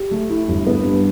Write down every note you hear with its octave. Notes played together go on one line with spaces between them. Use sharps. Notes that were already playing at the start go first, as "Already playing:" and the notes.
Already playing: G4
A3
E4
G1
B3
G2